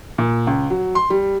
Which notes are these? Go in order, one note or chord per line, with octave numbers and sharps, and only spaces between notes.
A#2
C#2
F#3
C6
G3